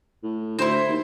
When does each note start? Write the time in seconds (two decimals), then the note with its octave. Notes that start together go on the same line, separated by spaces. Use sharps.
0.23 A2
0.59 D2 E4 C5
0.88 D#2